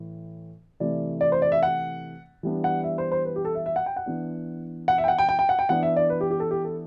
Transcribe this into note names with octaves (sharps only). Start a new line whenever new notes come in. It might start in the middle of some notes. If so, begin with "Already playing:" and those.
Already playing: A2 E3
C3 E3 A3 D5
D5
C5
D5
E5
F#5
E3 G3 B3 D4
F#5
E5
C5
C5
B4
G4
A4
E5
E5
F#5
G5
F#5
E3 B3 D4
F#5
E5
G5
F#5
G5
G5
G5
F#5
G5
E3 B3 D4 F#5
E5
D5
B4
G4
G4
A4
G4
A4